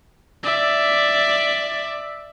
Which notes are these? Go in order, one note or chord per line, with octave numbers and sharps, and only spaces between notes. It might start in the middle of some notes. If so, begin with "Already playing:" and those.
D5 E5